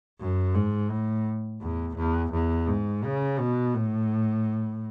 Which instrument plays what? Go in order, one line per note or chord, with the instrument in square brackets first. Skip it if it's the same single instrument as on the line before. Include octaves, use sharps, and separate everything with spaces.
[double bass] F#2
G#2
A2
E2
E2
E2
G#2
C#3
B2
A2